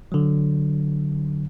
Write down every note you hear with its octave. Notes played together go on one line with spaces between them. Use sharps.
D3 F#3